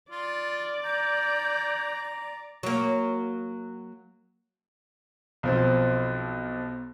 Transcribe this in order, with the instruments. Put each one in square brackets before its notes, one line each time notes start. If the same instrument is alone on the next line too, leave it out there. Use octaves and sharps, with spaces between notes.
[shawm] F4 [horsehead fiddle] D5
[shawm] A#5 [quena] G6
[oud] F#3 A#3
[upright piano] B1 F3 C4